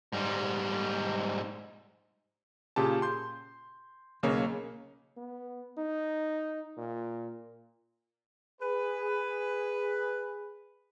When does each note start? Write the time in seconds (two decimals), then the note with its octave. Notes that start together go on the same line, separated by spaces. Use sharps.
0.13 G#2 G3
2.76 A#2 C#3 G4 A5
3.02 C6 G6
4.23 B1 C#3 A#3 C#5
5.17 B3
5.78 D#4
6.77 A#2
8.61 G#4 B4